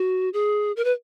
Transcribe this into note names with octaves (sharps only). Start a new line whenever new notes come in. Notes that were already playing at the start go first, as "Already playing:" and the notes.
Already playing: F#4
G#4
A#4
B4